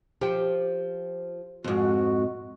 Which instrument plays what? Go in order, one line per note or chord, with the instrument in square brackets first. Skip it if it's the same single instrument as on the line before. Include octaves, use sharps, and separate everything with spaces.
[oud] F3 [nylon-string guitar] G4 G5
[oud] F2 G#2 [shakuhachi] F#4